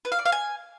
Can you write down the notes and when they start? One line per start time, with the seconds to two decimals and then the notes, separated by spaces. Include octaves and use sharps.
0.05 B4
0.12 F5
0.19 D5
0.25 F5
0.32 G#5